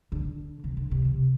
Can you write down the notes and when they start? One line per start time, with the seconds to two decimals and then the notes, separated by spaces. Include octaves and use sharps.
0.12 D3
0.64 C3
0.77 D3
0.91 C3
1.05 C3